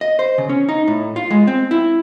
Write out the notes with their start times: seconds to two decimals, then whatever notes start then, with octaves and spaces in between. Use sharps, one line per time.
0.01 D#5
0.19 C5
0.38 C#3
0.49 C#4
0.69 D#4
0.88 A2
1.16 F4
1.31 G#3
1.47 C4
1.71 E4